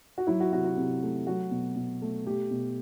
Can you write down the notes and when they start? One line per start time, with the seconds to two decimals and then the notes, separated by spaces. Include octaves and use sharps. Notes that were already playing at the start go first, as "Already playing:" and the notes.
0.18 F#4
0.27 F#3 E4
0.40 F#4
0.52 C3 F#4
0.65 F#4
0.77 C3
1.03 A3
1.27 F#3 F#4
1.51 B2
1.76 B2
2.02 A3
2.26 A3 G4
2.51 B2